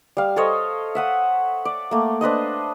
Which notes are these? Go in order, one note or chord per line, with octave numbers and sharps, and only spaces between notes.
G3 F5
A4 C5 C#5 D#5
E5 F#5 D#6
D5
A3 A#3
D4 B4 C5 D#5